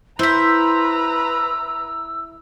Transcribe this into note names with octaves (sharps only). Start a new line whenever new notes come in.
E4 B4 C5 E5 A#5 E6